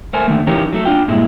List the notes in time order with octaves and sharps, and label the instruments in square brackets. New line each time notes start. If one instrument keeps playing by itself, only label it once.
[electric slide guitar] A3 A#4 C5 G#5
D3 D#3 A3
E3 C#4 D#4 G4 A#4 C#5
F#3 A3 A4
D4 F4 G5
G2 A#2 G#3 E4